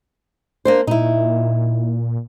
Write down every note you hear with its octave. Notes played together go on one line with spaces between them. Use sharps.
A#3 D4 C5
A#2 D#4 E4